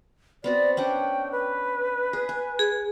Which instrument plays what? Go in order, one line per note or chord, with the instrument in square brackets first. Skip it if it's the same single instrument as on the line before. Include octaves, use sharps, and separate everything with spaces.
[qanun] B3 C4 F#4 [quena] D5
[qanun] C#4 D4 F#5 [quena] G5
[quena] B4
[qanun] G#4
G#5
[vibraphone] G#4